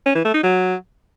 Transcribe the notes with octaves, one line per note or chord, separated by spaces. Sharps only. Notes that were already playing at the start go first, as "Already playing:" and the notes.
C#4
E3
A3
D#4
F#3